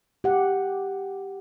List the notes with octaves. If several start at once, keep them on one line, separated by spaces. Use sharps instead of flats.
G4 F#5